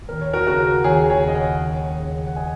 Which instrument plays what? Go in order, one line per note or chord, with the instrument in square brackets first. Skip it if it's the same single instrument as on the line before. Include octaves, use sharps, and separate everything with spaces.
[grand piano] D#2 A#4
C#5
F#4 A#4
C#3 F#4 A#4
D#2 G#4 C#5
G#4 C#5
C#3
D#5
C#5 F#5
D#2
C#3
F#5
D#5 G#5